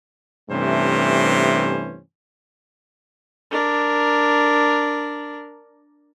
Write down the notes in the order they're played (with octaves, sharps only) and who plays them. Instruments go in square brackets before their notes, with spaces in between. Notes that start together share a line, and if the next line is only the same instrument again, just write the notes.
[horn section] G2 C3 E3 A3 C#4 C5
[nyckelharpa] D4 A#4